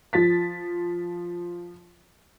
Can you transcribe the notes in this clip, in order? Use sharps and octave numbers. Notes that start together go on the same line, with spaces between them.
F3 A6 B6